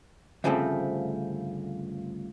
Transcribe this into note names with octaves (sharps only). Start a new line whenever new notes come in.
D2 G2 C#3 F3 A3 C4